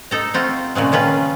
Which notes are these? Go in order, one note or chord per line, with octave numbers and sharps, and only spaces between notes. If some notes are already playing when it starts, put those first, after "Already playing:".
D#4 A4 A#5
C4 F4 F#4
A#2 C#3 F#3 G#3
D#3 C#4 F4 B4